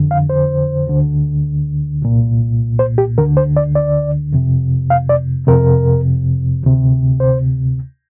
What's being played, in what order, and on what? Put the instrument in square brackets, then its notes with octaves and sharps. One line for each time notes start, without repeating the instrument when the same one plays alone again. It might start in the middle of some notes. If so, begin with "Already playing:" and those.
Already playing: [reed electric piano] F2 D3
F5
C5
D2 D3
C2 A#2
C5
G4
D2 D3 A#4
C5
D5
D5
F2 C3
F5
D5
F2 C3 A#4
D2 C3
C5